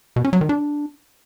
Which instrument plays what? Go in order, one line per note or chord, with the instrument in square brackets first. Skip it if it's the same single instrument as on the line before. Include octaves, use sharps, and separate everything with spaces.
[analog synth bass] B2
C#4
F#3
D#3
D4